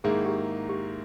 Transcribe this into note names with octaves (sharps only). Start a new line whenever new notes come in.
G#2 D#3 A#3 E4 G#4
G4
G4